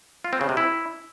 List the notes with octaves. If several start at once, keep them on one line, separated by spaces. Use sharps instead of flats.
F4
C4
C#3
C3
E4